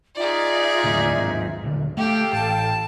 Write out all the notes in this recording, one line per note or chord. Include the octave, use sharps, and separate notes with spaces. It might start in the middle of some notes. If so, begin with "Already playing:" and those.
D#4 F4 G#4 D5 E5
D#2 A2 D3
D#2 G#2
D#1 D3
A3 G4 A4 F5 G5
A1 A5